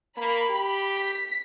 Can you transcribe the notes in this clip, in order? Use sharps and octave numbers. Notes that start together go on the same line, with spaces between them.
A#3 B5
G4
B6